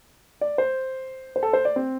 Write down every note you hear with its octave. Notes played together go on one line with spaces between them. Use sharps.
D5
C5
C5
A4
C5
D5
C4